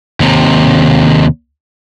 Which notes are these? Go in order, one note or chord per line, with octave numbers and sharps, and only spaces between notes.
D#2 C3